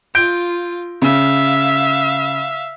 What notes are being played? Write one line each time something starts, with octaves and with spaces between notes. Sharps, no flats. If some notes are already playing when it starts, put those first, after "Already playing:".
F4 G6 D7
C#3 E5 F5